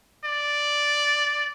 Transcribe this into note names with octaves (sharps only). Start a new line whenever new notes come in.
D5